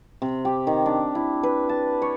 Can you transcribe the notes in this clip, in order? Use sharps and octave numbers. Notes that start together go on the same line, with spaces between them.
C3
G4
D#3
D4
E4
B4
A5
C#5